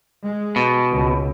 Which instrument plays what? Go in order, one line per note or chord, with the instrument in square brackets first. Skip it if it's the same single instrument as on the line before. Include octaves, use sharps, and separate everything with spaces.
[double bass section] G#3
[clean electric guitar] B2
[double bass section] C#2